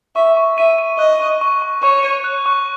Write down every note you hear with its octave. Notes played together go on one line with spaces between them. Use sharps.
E5 C#6
C#6
E5 D#7
D#7
D#5 F#6
C#6
C#6
C#6
C#5 C#6
D#7
F#6
C#6